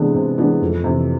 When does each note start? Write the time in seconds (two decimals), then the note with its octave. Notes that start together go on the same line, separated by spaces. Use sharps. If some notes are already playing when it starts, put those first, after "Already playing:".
Already playing: C3 E3 G#3 B3 D4
0.14 C3
0.38 E3 G#3 B3 D4
0.61 F2
0.84 C3 E3